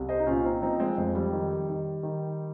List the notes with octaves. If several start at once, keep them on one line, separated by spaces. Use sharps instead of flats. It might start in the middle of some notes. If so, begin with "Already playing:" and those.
Already playing: C2
C5 D#5
D#4
A#2 C#4 F4
C4 D#4
F3 C4 D#4
G#3 C4
F2 G#3
G3
D#3
D#3
D#3